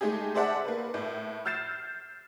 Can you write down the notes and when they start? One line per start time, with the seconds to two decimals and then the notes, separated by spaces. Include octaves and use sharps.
0.01 G#3 A3 D#4 G4 G#4
0.35 G#4 C5 D5 E5 F#5 A5
0.65 A#3 B4
0.94 A2
1.45 E6 F6 G6 A6 C7 E7